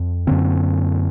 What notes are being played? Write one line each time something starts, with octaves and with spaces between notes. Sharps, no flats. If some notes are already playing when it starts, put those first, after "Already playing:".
Already playing: F2
F#2 D3 A#3 C4